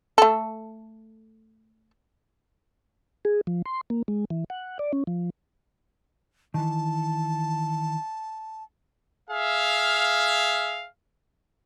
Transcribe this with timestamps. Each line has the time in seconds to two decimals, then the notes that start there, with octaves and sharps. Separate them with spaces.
0.18 A3 A4
3.25 G#4
3.47 F3
3.66 C6
3.90 A#3
4.08 G#3
4.30 E3
4.50 F#5
4.79 D5
4.93 C#4
5.07 F3
6.54 D#3 E3 A5
9.29 G#4 E5 F5